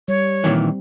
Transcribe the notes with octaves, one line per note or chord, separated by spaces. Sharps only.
G3 C#5
A#2 D#3 E3 C4